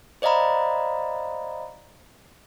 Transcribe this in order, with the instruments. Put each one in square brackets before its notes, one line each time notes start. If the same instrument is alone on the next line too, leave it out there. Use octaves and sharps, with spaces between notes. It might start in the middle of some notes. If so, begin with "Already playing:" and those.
[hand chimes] C5 D5 D#5 F5 A#5 B5